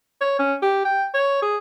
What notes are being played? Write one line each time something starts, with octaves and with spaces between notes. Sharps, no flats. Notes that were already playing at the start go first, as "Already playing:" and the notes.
C#5
C#4
G4
G5
C#5
G#4